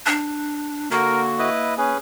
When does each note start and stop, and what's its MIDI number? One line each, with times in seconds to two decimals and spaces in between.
0.06 0.88 62
0.91 1.49 50
0.91 1.92 58
0.91 1.49 66
0.91 1.21 70
1.39 1.74 64
1.39 1.74 71
1.39 1.74 75
1.78 1.98 61
1.78 1.98 68
1.78 1.98 71